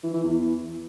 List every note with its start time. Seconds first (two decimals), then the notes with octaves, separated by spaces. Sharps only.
0.03 E3
0.14 E3
0.24 E2